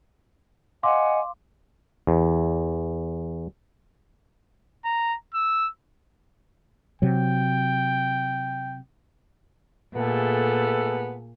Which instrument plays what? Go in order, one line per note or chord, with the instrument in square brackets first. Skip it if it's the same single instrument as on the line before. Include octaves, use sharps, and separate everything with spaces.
[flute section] D#5 F#5 G#5 [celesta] F5 C6 D6
[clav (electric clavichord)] E2
[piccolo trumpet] A#5
E6
[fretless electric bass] C3 F#3 [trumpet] G5
[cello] A#2 [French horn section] A3 G#4 A4 [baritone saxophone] B3